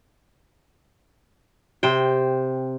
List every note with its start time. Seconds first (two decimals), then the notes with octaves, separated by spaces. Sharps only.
1.83 C3 C5 G5